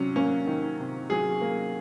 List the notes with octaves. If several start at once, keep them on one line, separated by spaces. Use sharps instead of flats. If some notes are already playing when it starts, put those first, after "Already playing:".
Already playing: C3 F#3 C#4
A#3 C#4
D#3
C3
F#3 G#4
A#3